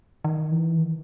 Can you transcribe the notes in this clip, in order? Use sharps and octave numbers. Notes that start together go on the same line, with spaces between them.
D#3
E3
D#3